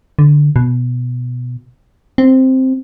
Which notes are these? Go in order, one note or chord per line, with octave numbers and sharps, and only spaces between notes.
D3
B2
C4